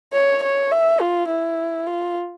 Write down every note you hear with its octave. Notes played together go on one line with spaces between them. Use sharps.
C#5
C#5
E5
F4
E4
F4